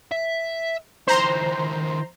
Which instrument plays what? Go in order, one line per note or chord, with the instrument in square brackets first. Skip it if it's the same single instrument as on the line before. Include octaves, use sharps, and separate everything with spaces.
[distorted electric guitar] E5
[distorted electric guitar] D#3 E4 [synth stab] C5 A#5 C6